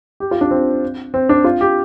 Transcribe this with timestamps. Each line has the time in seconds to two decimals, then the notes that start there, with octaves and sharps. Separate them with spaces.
0.20 G4
0.31 F4
0.41 D4
0.51 C4
1.14 C4
1.29 D4
1.44 F4
1.61 G4